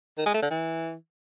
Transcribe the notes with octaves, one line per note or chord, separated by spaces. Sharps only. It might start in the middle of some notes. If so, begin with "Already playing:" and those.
D#3
G#3
A3
D3
E3